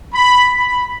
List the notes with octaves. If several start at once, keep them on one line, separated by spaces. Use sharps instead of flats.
B5
B5